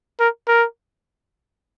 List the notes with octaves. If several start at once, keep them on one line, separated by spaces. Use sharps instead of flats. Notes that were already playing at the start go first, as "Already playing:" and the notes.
A#4
A#4